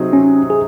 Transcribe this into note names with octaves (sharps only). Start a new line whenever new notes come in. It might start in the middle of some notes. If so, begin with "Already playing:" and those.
Already playing: C3 F#3 C4 D#4 G#4
C#4
G#4